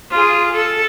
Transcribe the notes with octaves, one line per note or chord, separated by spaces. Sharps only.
F4 G#4
A4